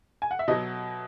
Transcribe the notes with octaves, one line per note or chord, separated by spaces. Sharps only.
G#5
F#5
E5
B2 F#3 D#5